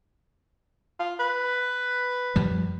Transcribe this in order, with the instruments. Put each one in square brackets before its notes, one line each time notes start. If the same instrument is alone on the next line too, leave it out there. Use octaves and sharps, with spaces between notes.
[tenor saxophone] F4
B4
[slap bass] F#2 F3 G3